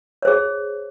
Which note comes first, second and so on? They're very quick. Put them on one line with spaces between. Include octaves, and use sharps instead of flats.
C#5 C5 G#4